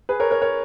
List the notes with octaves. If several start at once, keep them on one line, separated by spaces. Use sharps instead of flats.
G#4 B4
A#4 C#5
A#4 C#5
A#4 C#5